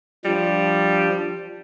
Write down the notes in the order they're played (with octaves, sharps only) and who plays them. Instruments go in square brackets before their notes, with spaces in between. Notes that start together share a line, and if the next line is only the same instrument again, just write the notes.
[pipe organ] F3 D4 [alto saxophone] G3